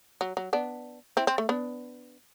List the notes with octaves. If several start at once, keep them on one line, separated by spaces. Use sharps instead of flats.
F#3
F#3
B3 D4
C4 E4
C4
A3
B3 D4